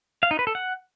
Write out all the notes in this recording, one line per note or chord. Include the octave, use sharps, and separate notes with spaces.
F5
D#4
B4
A4
F#5